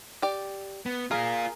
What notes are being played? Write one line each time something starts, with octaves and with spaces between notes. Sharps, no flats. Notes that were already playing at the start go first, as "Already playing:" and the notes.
G4 D5
B3
A#3 F4 G#4 A#4